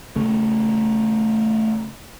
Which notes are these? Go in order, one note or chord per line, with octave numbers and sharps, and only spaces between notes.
C#3 A3